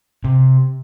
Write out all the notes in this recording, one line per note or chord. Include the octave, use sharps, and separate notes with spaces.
C3